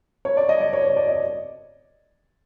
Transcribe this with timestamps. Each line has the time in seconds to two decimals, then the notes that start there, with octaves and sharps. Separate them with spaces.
0.25 C#5
0.37 D5
0.49 D#5
0.61 D5
0.73 C#5
0.85 C#5
0.97 D5
1.09 D#5